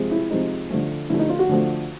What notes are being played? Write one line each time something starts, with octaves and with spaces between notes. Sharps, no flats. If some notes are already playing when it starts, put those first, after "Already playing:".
Already playing: C3 F3 G#3
E4
C3 F3 G#3 D#4
D3 F3 A3
D3 F3 A3 E4
D#4
F4
F#4
D3 F3 A3